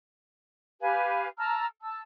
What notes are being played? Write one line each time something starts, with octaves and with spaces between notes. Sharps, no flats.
G4 B4 F5 G#5
A5 A#5 E6 F6
A5 E6